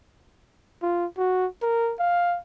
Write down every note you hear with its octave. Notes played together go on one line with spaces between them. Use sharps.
F4
F#4
A#4
F5